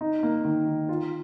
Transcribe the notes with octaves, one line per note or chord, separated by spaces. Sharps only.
D#4
A#3
D#3
D#3
F4